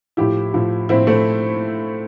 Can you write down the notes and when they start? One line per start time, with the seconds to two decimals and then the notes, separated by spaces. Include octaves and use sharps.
0.17 A2 F3 E4 G4
0.54 A2 F3
0.89 A2 F3 C4 E4
1.07 A3 C4